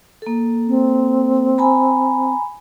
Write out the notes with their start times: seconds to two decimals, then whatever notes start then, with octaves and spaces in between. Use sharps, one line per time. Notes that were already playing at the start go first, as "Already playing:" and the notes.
0.22 A#3 A4
0.68 C4
1.58 G#5 A#5 B5